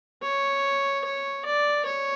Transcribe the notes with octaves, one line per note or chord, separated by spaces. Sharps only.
C#5
C#5
D5
C#5